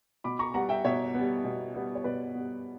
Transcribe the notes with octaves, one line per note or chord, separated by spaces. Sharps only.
B2 B5 D6
A#5 C#6
G3 B3 F#5 A#5
E5 G5
B2 C#5 E5
G3 B3
B2
G3 B3
C#5
B2 B4 D5
G3 B3